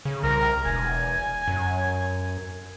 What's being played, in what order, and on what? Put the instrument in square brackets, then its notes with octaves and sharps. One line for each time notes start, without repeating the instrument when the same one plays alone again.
[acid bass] C#3
[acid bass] C2 [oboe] A#4
[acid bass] E1 [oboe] G#5
[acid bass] F#2